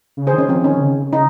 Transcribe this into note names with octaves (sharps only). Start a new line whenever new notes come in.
C#3
G#4 C5
D#3
C#4
F3 C4
D#3 C#4
D#3
C#3
D#4